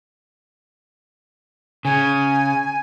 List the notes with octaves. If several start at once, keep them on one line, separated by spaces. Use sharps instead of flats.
C#3 G#5